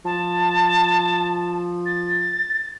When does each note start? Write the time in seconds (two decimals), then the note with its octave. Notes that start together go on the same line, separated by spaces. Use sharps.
0.05 F3 A5
1.86 A6